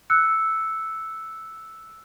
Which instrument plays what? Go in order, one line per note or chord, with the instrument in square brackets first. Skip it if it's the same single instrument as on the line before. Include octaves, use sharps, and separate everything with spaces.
[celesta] E6 F#6 C#7